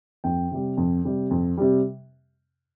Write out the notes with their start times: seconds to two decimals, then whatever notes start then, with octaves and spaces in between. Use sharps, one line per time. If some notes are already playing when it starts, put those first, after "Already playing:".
0.24 F2 G5
0.51 C3 G3
0.77 F2
1.05 C3 G3
1.31 F2
1.57 C3 G3